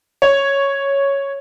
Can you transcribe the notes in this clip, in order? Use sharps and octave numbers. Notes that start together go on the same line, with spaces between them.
C#5